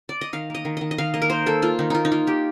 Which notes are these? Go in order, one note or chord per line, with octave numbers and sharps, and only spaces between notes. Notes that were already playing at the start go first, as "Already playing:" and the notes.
D5
D#5
D#3 F5
A#3 D#5
D#3
D#3 D#5
D#5
D#3 F5
A#3 D#5
A#4
A#3 C5
A#3 A4
A#3 F4
D#3 D#4
A#3 D#4 F4
D#4
A#3 F4
A#3 G4